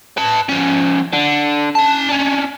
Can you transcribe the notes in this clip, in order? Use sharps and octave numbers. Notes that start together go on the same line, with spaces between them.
B4 A5
F3 C#4
D3
C#4 A5
C#4 D4